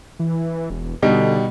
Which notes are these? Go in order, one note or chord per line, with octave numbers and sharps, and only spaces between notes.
E3
E1
B2 D3 G3 D#4